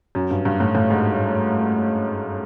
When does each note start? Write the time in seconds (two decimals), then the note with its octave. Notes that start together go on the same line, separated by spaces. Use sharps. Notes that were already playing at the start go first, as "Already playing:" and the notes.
0.15 F#2
0.31 G2
0.45 G2
0.60 A2
0.75 A2
0.90 G#2